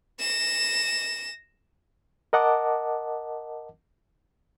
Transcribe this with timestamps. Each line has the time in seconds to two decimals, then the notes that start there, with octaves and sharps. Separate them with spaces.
0.20 A#6 E7
2.33 A#4 D#5 F#5 A5 D6